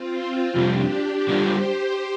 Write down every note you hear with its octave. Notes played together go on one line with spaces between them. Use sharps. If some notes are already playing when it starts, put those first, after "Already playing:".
Already playing: C4 F4
F2 C3 G3 D4 G4
D3 G3 F4 G4 C5